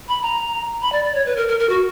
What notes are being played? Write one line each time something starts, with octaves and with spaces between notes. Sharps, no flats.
B5
A#5
B5
D5
D5
C#5
B4
A#4
A#4
A#4
F#4